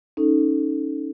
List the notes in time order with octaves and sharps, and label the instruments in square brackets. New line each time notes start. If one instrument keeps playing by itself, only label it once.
[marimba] C#4 D#4 A4